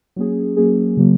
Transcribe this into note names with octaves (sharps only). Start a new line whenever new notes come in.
F#3 A#3 C#4 G#4
F#3 A#3 C#4 G#4
C#3 F#3 A#3